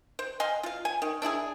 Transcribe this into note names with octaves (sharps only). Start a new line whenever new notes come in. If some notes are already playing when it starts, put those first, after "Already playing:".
C5
D#5 F5 G#5 C6
F4 F5
G#5
D#3
D4 E4 F#4 G#4